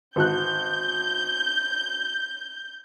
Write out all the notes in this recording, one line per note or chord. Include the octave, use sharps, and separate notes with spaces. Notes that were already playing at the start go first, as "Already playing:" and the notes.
G#1 F#4 F#6 G6